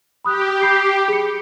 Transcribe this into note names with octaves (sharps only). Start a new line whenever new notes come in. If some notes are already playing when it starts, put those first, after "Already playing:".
G4 B5 D#6 F#6
B5 G6 C7
G#4 C#7